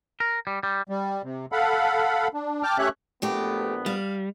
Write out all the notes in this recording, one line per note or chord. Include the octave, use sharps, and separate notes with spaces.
A#4
G3
G3
G3
C3
A4 F5 F#5 B5
D4
G5 A5 D6 F6
A3 C#4 G4 C#5 E5 F#6
A#1 F#3 A3 B3 G4
G3 F5